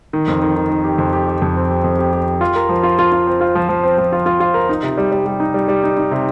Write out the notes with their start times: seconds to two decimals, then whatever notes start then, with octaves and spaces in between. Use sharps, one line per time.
0.13 D#3
0.28 F2
0.42 D#3
0.56 D#3
0.70 D#3
0.84 G4
0.98 F2
1.13 G4
1.28 G4
1.42 F2
1.56 C4
1.70 G4
1.84 F2
1.99 G4
2.13 G4
2.26 G4
2.41 F4
2.56 A#4
2.69 F3
2.83 F4
2.99 F4
3.12 F4
3.27 C4
3.41 F4
3.55 F3
3.69 F3
3.83 C4
3.98 F3
4.12 F4
4.26 F4
4.40 F4
4.54 A#4
4.69 D#4
4.83 C3
4.98 G3
5.12 G3
5.26 G3
5.40 D#4
5.54 G3
5.68 G3
5.83 D#4
5.97 D#4
6.11 C3